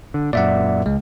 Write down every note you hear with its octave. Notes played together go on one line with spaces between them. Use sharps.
D3
F#2 A#2 D5 E5 F#5
C#2 G#3